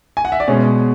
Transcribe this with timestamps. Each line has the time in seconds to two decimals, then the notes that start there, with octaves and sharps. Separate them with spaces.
0.17 G#5
0.25 F#5
0.32 E5
0.40 D5
0.48 B2 G#3 B3 C#4 C#5